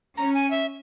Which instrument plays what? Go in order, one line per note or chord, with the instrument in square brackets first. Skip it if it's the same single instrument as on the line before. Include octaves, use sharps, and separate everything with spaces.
[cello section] C#4 [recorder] A#5
[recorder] G#5
E5